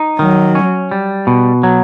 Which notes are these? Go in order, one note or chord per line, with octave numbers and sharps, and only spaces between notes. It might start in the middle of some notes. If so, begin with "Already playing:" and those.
Already playing: D#4
D#3 F#3
C#4
G3
B2
F#3